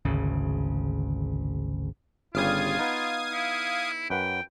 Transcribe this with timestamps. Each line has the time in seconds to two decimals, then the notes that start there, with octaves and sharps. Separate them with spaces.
0.05 G#1 D2 C#3
2.35 G1 C#3 G3 F4 F5 D#6 G#6
2.79 B3 D#4
3.33 E4
4.10 F#2 B4 F#5 G5